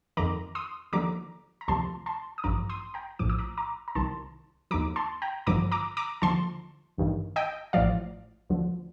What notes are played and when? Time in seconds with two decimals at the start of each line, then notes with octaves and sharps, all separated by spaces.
0.17 F2 D#3 A#5 D6
0.55 C6 D#6
0.93 D#2 D3 F3 A#5 D6
1.61 A#5
1.68 D2 C3 F3 A5 C6
2.06 A5 C6
2.38 D#6
2.44 A1 G2 F3 A#5 D6
2.69 C6 D#6
2.94 G5 A#5
3.19 A#1 A2 F3 D6
3.30 D#6
3.39 A#5 D6
3.57 A#5 D6
3.88 A#5
3.95 C2 C3 D#3 A5 C6
4.71 D#2 D3 F3 A#5 D6
4.96 A5 C6
5.22 G5 A#5
5.47 A1 G2 D3 F3 A#5 D6
5.72 A#5 D6
5.97 A#5 D6
6.22 D#2 D3 F3 A5 C6
6.98 A1 G2 D#3
7.36 D#5 G5
7.73 A1 A2 F3 D5 F5
8.50 D2 D3 F3